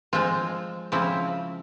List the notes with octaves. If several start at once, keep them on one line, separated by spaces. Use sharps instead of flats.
F3 G#3 C4 F4
C#3 F3 C4 E4